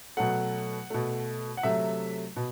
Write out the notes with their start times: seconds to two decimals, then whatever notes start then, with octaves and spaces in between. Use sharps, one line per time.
0.17 B2 F#3 A3 F#5
0.90 B2 A3
1.57 F#5
1.63 C3 F#3 A3 E5
2.36 B2